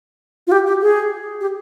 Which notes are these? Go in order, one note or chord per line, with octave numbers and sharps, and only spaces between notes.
F4
G4
G4
G#4
G4